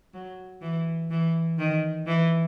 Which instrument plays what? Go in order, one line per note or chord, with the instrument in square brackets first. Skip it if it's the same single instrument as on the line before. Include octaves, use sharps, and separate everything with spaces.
[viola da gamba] F#3
E3
E3
D#3
E3